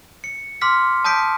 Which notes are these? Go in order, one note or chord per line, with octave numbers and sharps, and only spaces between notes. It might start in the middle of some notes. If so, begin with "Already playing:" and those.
C#7
C6 D6 F6 B6
A5 D#6 G6 B6 D7